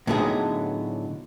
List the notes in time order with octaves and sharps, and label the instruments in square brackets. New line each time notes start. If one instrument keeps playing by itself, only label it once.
[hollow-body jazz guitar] A2 D3 F#3 B3 D#4 G#4